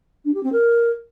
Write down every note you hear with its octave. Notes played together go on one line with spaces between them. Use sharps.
D4
G4
C4
A#4